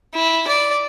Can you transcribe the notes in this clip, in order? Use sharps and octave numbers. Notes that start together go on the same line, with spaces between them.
E4
D5